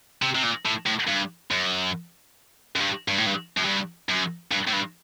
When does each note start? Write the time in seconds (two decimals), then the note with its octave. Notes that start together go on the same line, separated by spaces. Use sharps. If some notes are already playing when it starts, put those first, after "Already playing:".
0.22 C3
0.35 C3
0.43 A#2
0.66 A2
0.86 A2
1.08 G2
1.51 F#2
2.76 F#2
2.80 G2
3.08 G2
3.18 A2
3.26 G2
3.57 F#2
3.65 G2
4.09 F#2
4.51 G2
4.67 A2
4.73 G2